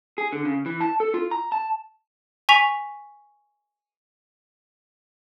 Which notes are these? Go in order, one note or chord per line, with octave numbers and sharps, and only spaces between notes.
G#4
D3
C#3
E3
A5
A4
F4
A#5
A5
G#5 C#6 B6 F7